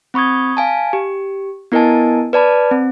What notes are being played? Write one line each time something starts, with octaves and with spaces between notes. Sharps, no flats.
C4 B5 C#6 D#6 G#6
F5 G#5 A5
G4
B3 E4 A#4 D#5 G#5 A5
B4 D5 A5 B5
C4